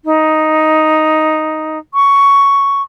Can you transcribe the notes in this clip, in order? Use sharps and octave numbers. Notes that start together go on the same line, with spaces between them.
D#4
C#6